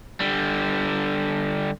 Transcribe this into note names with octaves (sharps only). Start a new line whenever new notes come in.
D3 G3